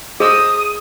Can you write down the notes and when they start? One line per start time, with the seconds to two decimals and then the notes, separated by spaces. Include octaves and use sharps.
0.20 G#4 C5 D#5 D#6 E6